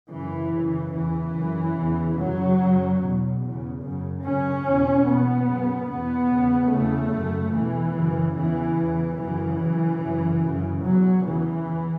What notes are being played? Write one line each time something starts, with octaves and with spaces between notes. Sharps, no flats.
F#2 C#3 E3
F#2 C#3
E2 C#3 E3
F#2 C#3
E2 C#3
F#2 C#3 F#3
F#2 C#3
E2 B2
E2 C#3
F#2 C#3
F#2 C#3 C#4
E2 B2
E2 B2 B3
F#2 C#3
E2 B2 B3
E2 C#3
E2 C#3 A3
F#2 C#3
E2 B2 E3
F#2 C#3
E2 C#3 E3
E2 C#3
F#2 C#3 E3
F#2 C#3
F#2 C#3
F#2 C#3
E2 B2 F#3
E2 C#3 E3
E2